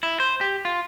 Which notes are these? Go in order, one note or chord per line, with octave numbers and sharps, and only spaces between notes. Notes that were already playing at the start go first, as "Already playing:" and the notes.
E4
C5
G4
F4